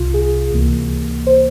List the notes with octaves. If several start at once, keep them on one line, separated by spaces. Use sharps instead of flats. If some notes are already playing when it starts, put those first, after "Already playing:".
Already playing: C2 C3 F4
G#4
C#2 C3 E3 A#3
C5